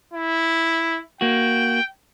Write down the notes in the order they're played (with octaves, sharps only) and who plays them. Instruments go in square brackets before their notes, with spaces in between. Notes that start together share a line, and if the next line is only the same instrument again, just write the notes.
[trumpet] E4
[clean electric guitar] A#3 F#4 [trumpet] G5